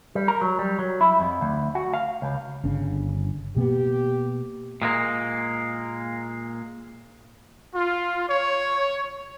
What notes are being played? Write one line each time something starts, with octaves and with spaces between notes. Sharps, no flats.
G3
A#4
F#3
G3
F#3
E4
F2
D2
F#4
F5
C#2
G1 C#3 D4
B2 A#3 B3 G4
A#2 G#3 A#3
F4
C#5